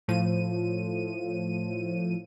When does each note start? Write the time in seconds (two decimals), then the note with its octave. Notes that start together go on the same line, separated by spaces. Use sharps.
0.08 A2 F3 D#7